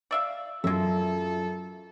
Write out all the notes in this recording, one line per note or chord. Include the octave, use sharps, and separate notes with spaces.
D5 E5 F5
F#2 G#3 F4 A4 E5